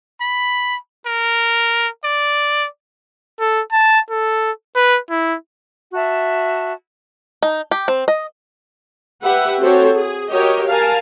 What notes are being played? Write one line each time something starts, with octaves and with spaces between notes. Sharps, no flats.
B5
A#4
D5
A4
A5
A4
B4
E4
F#4 E5 A5
D#4
G4
C4
D#5
G4 B4 E5 F#5
C4 F#4 G4 A4 C5 C#5
G#4
F#4 G4 A#4 C#5 D#5
A#4 F5 G#5 A5